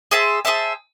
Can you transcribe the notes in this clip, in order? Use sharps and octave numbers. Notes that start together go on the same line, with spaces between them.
G#4 C5 E5 A5
G#4 C5 E5 A5